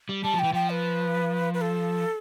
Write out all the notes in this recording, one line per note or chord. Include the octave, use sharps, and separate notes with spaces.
G3
G3 A5
F3
E3 G5
F3 G5
B4
B4
A4